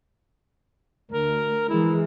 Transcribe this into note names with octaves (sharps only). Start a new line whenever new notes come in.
D2 A#4
E3 G#3 E4